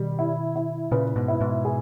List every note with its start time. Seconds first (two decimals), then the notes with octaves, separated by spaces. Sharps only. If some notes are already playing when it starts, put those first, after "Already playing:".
Already playing: B2 D#3 G3
0.19 E4
0.56 E4
0.91 A#2 C#3 B4
1.16 G#2 B2
1.28 E4
1.41 G#2 B2
1.65 G#4